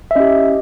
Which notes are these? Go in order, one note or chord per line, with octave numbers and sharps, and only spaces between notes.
E5
C#4 E4 G4 D#5